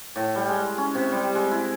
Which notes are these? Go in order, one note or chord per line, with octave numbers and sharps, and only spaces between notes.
A2
G3
G#3
C#4
C3
G3
G#3
E4